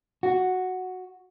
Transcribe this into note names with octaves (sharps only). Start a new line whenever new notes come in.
F#4